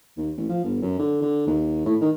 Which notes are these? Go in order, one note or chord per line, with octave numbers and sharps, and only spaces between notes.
D#2
A1
F3
G1
F#2
D3
D3
D#2
A2
D#3